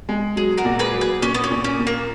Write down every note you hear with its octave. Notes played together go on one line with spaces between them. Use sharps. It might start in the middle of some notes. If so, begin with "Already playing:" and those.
G#3
F#3 G#4
F#4 A#4
A#2
G#4 B4
F#3
G#4 B4
A#2 C#4
B3
C#4
A#2
C#4
A#2
A#3